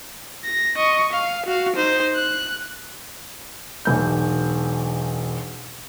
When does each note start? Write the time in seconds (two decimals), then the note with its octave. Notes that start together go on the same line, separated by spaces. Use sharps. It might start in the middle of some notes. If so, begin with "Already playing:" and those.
0.45 A#6
0.77 D#5 C#6
1.13 F5
1.46 F#4 F5
1.76 D#4 C5
2.15 F#6
3.85 E1 B1 G6